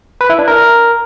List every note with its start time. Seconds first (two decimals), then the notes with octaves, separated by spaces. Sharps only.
0.21 B4
0.30 E4
0.39 D4
0.48 A#4